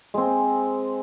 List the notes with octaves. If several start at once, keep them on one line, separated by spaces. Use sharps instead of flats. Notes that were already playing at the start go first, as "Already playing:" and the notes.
G#3 C4